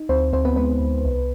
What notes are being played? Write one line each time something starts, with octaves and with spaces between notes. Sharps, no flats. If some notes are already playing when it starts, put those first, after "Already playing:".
Already playing: D#4
D2 C4 C5
D2 C4 C5
B3 B4
G#3 B3 B4
D2
C2